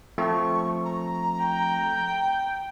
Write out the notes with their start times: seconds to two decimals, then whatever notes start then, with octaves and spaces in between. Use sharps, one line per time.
0.18 F3 A3 C4 C#6
0.85 A#5
1.44 G5